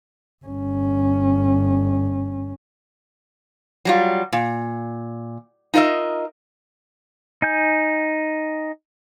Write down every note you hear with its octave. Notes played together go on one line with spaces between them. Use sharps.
G1 C#4
F#3 G3 F4
A#2
D#4 F4 A#4 D#5 E5
D#4 G#5 G6